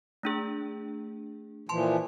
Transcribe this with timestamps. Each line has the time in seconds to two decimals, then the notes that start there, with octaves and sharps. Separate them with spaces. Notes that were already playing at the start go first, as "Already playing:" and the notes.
0.23 A3 D4 G#4
1.69 A#2 E3 F3 A5 C6